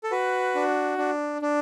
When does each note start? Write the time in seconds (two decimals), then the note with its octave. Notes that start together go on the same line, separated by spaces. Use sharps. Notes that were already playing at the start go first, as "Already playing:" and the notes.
0.03 A4
0.11 F#4 B4
0.55 D4
0.98 D4
1.42 D4